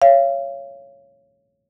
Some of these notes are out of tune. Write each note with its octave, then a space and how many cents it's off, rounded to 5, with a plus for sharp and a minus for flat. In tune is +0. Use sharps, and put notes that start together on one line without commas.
C#5 +0 F5 -30